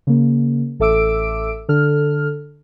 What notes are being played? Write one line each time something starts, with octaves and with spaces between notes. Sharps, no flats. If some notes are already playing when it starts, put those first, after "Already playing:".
C#3 A#3
A1 A4 E5 D6 E6 D7
D3 A4 F6